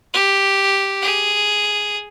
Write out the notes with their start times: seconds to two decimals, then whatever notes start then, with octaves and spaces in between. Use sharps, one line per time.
0.14 G4
1.02 G#4